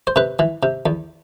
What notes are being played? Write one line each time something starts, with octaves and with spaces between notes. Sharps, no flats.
C5
C3 B4
E3
C3
E2